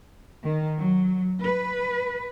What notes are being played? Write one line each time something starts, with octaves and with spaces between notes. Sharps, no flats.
D#3
F#3
B4